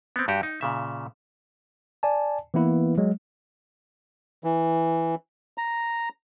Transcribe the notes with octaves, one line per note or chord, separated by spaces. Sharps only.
B3 C4
G2 F#4 G4
D#4
A#2 C#3 E5
D5 G#5 A5
E3 A#3 B3 E4 B4
F#3 G#3
E3
A#5